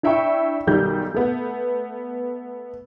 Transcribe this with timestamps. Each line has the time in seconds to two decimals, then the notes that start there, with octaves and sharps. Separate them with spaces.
0.03 D4 E4 E5 G5 B5 C#6
0.67 B1 D#3 G3 G6
1.14 A3 B3